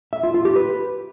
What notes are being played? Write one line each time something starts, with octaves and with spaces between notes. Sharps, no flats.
E5
F4
F4
G4
B4